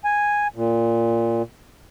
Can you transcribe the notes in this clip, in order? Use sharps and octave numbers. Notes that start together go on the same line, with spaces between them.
G#5
A#2